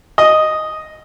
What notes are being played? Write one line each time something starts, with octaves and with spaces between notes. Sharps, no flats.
D#5